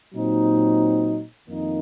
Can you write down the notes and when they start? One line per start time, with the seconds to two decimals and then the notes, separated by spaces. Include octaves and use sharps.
0.14 A#2 F#3 C4 D#4
1.49 F2 D#3 A#3 D#4